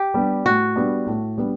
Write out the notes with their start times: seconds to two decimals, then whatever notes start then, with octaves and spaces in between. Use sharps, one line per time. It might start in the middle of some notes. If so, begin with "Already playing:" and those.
Already playing: G4
0.14 G3 B3 D4
0.45 A2 F#4
0.76 G3 B3 D4
1.07 A2
1.38 G3 B3 D4